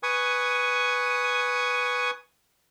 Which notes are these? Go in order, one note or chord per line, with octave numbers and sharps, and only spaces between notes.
B4 G#5 C#6 D#6